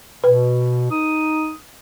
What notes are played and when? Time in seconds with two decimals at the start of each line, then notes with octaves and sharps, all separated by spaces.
0.24 B2 B4
0.91 D#4 D#6